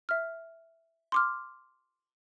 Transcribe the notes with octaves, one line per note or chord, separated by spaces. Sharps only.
E5 F6
C6 D6 F6